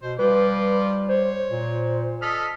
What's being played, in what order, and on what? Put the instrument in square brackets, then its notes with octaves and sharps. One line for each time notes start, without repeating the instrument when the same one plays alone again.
[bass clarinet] B2 [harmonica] C5
[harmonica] F3 F4 D6 [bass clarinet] G3 [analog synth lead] B4
[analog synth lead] C5 [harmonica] C#5
[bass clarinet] A#2
[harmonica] A4 D#5 F6 [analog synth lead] B6